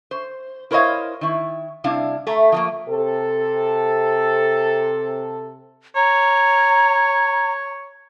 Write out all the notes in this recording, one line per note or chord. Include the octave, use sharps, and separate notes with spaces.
C5
E4 A#4 C5 C#5 D#5 F5
D#3 E4
C3 G3 D4 E4 F5
A3 E5 A#5
F3 A3 A#3
C3 A4
C#5 A#5